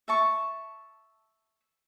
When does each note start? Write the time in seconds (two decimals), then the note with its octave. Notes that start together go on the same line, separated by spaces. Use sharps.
0.08 E5 A5 C#6